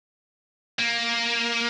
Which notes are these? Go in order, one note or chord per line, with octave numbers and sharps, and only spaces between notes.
A#3